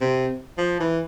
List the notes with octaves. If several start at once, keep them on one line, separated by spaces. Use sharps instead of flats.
C3
F3
E3